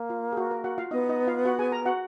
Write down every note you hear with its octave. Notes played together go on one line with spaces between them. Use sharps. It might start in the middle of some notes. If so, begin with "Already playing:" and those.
Already playing: A#3
F4
G#4
F#4
A#4
F#4 F#5
F4 F5
B3 D#4 D#5
D#4 D#5
F4 F5
F#4 F#5
G#4 G#5
A#4 A#5
F#4 F#5